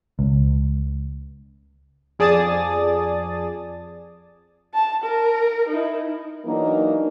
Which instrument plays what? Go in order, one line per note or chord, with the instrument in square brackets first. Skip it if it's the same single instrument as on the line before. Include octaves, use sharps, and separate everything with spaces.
[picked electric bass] C#2
[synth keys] F2 G#4 D5 A5 D#6 A6
[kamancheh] A5
A#4
D#4 E4
[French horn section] E3 F#3 A#3 D4 D#4 A#4